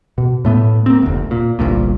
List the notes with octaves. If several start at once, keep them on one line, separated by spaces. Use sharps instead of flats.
B2
A2 A3 B3
A#3 C4
F1 D2
A#2
G1 C2 G2 A#2